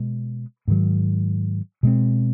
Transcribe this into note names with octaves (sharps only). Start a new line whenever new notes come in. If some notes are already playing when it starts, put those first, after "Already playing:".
Already playing: B2 G#3
G#2 D#3 F#3
B2 G#3 C4